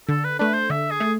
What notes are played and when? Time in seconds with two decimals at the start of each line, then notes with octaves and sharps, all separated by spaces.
0.09 D3 A4
0.24 B4
0.39 A3 D4 B4
0.54 C5
0.70 D3 E5
0.91 G#4
1.00 A3